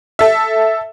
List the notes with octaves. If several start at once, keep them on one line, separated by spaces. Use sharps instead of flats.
A4 E5